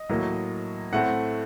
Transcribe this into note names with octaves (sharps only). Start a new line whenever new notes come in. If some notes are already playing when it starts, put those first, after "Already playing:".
Already playing: D#5
A2 F#3 A#3
A2 A3 C4 F#5